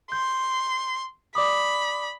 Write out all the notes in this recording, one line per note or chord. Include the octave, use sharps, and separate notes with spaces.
C6 G6
D5 B5 D6 D#6